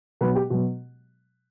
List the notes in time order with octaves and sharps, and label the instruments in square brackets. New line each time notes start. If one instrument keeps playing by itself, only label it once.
[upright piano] B2 F#3 B4
G4
B2 F#3 F#4